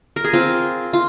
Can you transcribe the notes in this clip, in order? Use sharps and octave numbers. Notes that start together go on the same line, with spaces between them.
A#4
G#4
C4 F4
F4